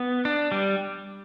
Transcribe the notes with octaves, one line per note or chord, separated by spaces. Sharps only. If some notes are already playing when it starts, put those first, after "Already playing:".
Already playing: B3
D4
G3